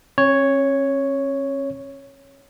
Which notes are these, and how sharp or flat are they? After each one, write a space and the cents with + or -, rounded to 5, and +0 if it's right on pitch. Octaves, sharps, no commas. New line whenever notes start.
C#4 -40 C#5 +0